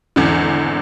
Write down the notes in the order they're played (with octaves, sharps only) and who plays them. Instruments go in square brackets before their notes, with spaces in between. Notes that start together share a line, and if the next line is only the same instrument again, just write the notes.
[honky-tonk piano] G#1 E2 D3